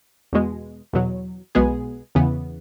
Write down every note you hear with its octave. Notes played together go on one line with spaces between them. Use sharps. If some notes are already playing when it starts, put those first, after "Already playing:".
E2 B2 G#3
E2 B2 F#3
B1 B2 G#3 B3 G#4
E2 C#3 E3 B3